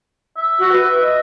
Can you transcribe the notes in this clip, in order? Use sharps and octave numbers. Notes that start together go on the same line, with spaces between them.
E5
F#4
B4
D#5